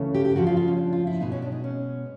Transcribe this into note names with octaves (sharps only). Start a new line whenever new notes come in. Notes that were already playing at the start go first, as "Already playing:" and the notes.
Already playing: D2 C#3 E3 A3 C#4
G4
G4
F2 C#3 F3 F#4
F4
F4
C#4
D4
F4
E4
B2 G#3 B3 D#4
C#4
D4
D#4
C#4